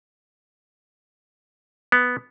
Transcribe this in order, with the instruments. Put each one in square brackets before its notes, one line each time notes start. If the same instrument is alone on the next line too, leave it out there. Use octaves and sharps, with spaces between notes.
[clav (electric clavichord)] B3